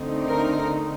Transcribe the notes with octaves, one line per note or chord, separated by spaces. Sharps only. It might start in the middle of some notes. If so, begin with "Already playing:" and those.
Already playing: D3 A3 C4 D#4
A#4